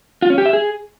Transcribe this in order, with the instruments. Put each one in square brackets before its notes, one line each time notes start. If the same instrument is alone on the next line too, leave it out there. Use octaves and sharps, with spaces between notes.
[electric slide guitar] F4
C#4
G4
E5
G#4